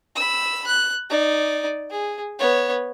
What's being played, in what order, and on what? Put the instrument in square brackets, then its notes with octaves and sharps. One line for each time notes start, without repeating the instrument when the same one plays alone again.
[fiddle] B5 E6
F#6
D#4 D5
G#4
B3 C#5